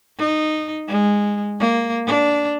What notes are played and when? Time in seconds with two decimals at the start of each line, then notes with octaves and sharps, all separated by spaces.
0.18 D#4
0.88 G#3
1.60 A#3
2.06 D4